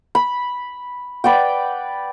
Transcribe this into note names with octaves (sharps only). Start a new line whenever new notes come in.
B5
B4 D5 F#5 G5